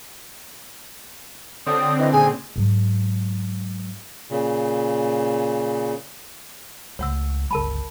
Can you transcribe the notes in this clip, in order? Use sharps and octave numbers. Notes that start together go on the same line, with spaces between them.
D3 C4 C#5 D5 G5 D#6
E4 B4 D#5 B5
A#2 C#3 G#4 G#5
G#2 F#3
A#2 C#3
C#2 A3 C#5 F#5 E6
G1 C#2 A#4 A5 B5